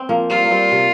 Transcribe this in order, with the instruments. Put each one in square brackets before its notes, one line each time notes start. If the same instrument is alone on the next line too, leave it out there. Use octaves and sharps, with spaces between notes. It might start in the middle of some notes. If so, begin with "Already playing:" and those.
Already playing: [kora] C4
F3 A#3
[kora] G3 C4 [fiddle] F4
[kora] A#3
G3 C4
C3